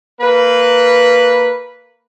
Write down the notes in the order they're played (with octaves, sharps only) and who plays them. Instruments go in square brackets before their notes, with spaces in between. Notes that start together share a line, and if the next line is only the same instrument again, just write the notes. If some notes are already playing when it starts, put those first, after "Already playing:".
[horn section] A#3 B4